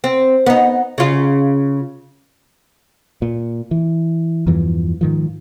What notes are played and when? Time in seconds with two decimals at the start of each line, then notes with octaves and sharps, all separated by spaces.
0.04 C4
0.46 B3 D#4
0.98 C#3 F4
3.22 A#2
3.71 E3
4.47 E2 G2 E3 F3
5.01 G#2 D#3 F3